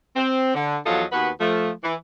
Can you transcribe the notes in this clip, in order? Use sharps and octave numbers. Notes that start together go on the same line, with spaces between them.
C4
D3
E2 F3 F#3 F4 A4 D#5
D#2 B3 F#4 B4
F3 A3
E3